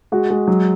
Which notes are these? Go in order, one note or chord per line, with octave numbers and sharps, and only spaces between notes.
G#3 F#4
G#3
F#3